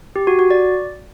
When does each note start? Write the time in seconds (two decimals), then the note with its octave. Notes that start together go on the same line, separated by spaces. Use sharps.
0.16 G4
0.27 F#4
0.39 F#4
0.51 D5